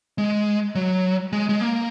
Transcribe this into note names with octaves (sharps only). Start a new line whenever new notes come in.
G#3
F#3
G#3
G#3
A#3